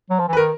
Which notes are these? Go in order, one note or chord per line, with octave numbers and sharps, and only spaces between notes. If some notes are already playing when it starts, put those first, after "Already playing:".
F#3
F3
E3
B4
D#3 A#4